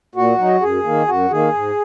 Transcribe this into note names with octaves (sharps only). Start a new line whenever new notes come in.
A#2 F#4
F#3 D#4
F#2 G#4
D#3 A#3
F#2 F#4
D#3 A#3 G#4
G#2